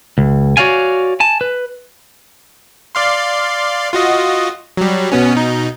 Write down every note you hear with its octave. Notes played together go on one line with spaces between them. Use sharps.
C#2
F#4 C#5 D5 F5 G#5
G#5 A5
B4
D5 F5 C6
F4 F#4 D#5
F#3 G3
B2 B3 C#4
B2 D#4